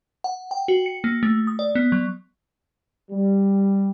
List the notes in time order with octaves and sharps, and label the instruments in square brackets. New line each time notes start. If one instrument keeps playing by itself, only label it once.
[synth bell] F#5
G5
F#4
C#7
A#3
A3
D#6
D5
B3
F#3
[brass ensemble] G3